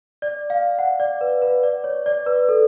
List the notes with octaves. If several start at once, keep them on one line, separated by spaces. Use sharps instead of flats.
D5
F5
F#5
D5
B4
B4
D5
C#5
D5
B4
A4